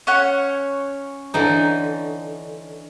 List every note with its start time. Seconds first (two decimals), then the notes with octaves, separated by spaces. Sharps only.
0.07 C#4 C#5 F#5
1.34 D3 E3 D#4